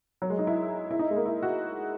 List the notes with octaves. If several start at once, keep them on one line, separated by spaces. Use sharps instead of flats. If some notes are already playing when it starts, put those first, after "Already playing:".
F#3
G#3
D#4
E4
E4
D#4
G#3
A#3
E4
F#4